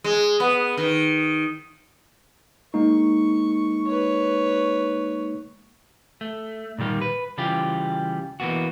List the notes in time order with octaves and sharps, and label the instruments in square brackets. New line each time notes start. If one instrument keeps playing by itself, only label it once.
[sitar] G#3
B3
D#3
[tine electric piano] G#3 A#3 D#4 [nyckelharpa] C#6
[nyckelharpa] B4 C#5
[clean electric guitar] A3
A#2 D#3 G3 A#3
B4
C#3 E3 G3 F4 G4
E3 A#3 B3 F#4